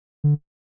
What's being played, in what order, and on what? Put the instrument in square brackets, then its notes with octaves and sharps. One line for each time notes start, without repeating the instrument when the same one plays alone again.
[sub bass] D3